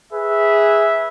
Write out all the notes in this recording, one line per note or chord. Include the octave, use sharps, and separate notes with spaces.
G#4 B4 E5